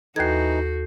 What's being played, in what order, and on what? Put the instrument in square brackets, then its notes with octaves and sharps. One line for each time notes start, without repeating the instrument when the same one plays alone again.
[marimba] D#2 G#6 [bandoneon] E3 D#4 [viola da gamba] F#4 [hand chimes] A4 G6 C7